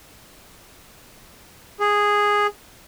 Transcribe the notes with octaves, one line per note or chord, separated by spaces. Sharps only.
G#4